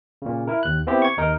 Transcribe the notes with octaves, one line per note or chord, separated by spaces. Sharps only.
A#2 C#3
E4 A#4
D#2 F#6
B3 C4 E4 G4
C#6 G#6
D#2 D#4 A#4